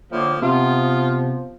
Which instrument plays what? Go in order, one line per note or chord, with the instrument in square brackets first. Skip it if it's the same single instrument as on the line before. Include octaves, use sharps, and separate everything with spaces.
[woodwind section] A2 D3 A#3 [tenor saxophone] F3
[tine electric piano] C3 [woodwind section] F3 B3 [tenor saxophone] F4